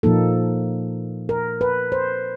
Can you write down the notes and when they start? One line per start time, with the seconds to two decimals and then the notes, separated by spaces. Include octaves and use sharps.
0.03 A#2 F3 A#3 D#4 A4
1.29 A#4
1.61 B4
1.92 C5